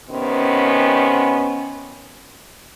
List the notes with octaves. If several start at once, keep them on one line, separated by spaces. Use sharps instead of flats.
C3 D#3 B3 C#4